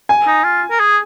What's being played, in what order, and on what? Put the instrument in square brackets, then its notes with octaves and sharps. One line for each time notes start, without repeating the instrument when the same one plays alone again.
[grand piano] G#5
[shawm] D#4
F4
A#4
G#4